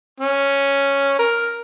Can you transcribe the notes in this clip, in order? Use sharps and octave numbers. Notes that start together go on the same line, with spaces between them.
C#4
A#4